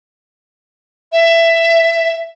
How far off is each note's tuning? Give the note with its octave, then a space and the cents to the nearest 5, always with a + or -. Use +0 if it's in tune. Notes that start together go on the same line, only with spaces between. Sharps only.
E5 +15